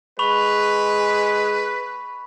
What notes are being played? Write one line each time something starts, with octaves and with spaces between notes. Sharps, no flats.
G#3 B4 B5 C#6 F7